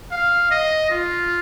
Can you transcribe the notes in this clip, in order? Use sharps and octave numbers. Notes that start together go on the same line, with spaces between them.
F5
D#5
F4